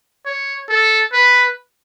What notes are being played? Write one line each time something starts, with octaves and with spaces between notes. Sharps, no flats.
C#5
A4
B4